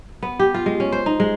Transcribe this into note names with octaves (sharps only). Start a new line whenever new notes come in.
B3
G4
F4
G#3
C#4
C5
D#4
G#3